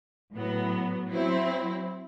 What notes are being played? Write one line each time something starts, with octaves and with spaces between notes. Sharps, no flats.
A2 F#3 B3
F#3 C4 E4